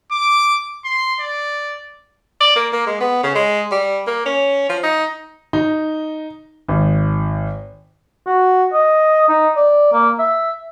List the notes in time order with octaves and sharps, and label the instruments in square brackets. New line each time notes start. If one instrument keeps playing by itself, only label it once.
[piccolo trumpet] D6
C6
D5
[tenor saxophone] D5
A#3
A#3
G#3
B3
C#3
G#3
G3
A#3
C#4
F3
D#4
[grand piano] D#4
G#1
[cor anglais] F#4
D#5
D#4
D5
A#3
E5